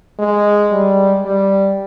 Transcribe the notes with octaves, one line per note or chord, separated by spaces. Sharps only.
G#3
G3
G3